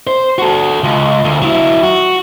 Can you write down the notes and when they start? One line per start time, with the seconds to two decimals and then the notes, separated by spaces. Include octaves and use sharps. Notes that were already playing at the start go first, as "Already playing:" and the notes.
0.07 C5
0.38 F#4 A4
0.83 C#2
1.25 D2
1.42 F#3 E4
1.83 F#4